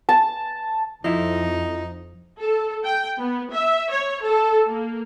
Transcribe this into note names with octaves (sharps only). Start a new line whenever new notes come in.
A5
F2 F3 D#4 E4
A4
G5
B3
E5
C#5
A4
A#3